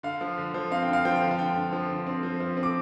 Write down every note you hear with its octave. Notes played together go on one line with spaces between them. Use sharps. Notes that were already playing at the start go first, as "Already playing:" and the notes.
D3 F5
F3
D3
F3
C4 F5
G5
D3
F5
F3 G5
F5
D3
F5
D3 G5
D3
F3
D3
C4
F3
F3
C4
D6